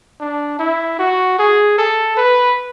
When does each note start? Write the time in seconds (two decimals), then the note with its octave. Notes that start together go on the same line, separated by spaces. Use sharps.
0.20 D4
0.59 E4
0.99 F#4
1.39 G#4
1.78 A4
2.17 B4